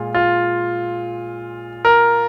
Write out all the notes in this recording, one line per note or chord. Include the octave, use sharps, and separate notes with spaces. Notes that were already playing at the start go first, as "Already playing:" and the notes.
Already playing: A#2 G#3 F4
F4
A#4